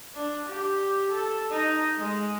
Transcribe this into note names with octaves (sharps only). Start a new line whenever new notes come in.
D4
G4
A4
D#4
G#3